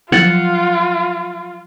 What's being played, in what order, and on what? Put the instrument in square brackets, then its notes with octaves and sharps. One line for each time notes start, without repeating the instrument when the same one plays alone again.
[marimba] F3 F#3 [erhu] F4 [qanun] F#5